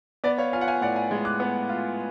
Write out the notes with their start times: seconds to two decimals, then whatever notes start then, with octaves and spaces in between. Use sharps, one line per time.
0.24 B3 D5
0.38 C#5 F5
0.53 F4 F5 G#5
0.61 F#5
0.68 F5 G#5
0.81 A2 D5 F#5
0.96 F5 G#5
1.11 G#3
1.25 D6 F#6
1.40 B3
1.69 F4